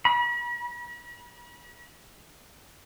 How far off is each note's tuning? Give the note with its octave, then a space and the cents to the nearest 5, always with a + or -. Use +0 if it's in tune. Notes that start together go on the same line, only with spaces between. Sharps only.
B5 -45